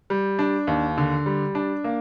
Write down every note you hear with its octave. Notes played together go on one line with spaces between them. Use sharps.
G3
D4
D#2
D3
G3
D4
A#3